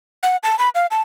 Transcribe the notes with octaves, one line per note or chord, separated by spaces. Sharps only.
F#5
A5
B5
F5
A5